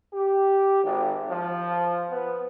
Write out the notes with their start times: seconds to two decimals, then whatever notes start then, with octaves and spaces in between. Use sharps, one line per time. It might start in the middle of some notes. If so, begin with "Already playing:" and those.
0.13 G4
0.84 G#1
1.29 F3
2.10 B3